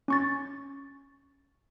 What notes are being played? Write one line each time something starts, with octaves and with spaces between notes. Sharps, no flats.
C#4 C#6 A6